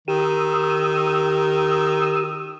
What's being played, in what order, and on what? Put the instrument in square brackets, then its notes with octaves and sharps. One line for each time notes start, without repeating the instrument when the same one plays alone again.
[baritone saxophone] D#3 [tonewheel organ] G4 D#6 E6